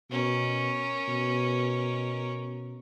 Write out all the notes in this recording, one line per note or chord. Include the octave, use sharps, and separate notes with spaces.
B2 C#4 A#4
B2